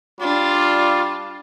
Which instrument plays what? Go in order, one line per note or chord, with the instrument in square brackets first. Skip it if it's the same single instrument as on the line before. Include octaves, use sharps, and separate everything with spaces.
[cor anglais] G3 [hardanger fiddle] D4 [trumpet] F4